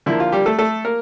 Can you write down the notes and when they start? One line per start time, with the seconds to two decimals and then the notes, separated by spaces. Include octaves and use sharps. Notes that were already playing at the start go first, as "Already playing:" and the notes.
0.06 D3 F3 A#3 E4
0.20 F4
0.32 G3 G4
0.46 A3 A4
0.59 A3 A4
0.85 A#3 A#4